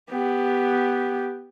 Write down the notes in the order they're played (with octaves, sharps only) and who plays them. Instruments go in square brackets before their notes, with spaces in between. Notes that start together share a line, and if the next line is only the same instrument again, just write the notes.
[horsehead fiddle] B3 G4